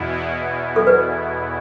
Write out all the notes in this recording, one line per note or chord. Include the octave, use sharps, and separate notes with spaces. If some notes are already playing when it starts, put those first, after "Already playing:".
Already playing: E2 B2 B3 E4
A4
B4